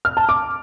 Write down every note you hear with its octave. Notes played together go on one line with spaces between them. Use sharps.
F6
A5
D6